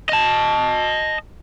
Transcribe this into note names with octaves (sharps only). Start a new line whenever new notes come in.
D#5 A5